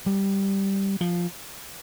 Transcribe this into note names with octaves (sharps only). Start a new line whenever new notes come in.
G3
F3